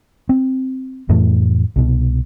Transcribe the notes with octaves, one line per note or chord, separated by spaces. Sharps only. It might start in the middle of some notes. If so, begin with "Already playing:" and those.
C4
F2 A2 E3 A3
C2 B2